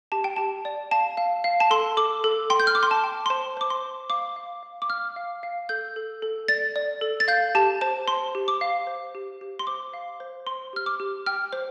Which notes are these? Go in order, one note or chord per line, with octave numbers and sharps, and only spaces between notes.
G4 A5
G5
G4 A5
D5
F5 A5
F5
F5
A5
A4 C6
A4 D6
A4
G5 C6
G6
F6
G5 D6
C6
A5
G5
C6
C5 A5
C5 D6
C6
C5
F5 D6
F5
F5
D6
F5 F6
F5
F5
A4 G6
A4
A4
D5 A6
D5
A4
A6
F5 G6
G4 A5
C5 A5
C5 C6
G4
D6
F5
C5
G4
G4
C6
C5 D6
F5
C5
C5 C6
G4 F6
D6
G4
G5 F6
C5